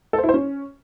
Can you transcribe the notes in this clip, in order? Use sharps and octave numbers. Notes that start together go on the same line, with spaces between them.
A4
C5
E4
C5
C#4